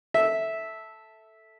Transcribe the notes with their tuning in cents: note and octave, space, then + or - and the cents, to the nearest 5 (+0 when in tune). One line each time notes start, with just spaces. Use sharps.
A4 +0 E5 -10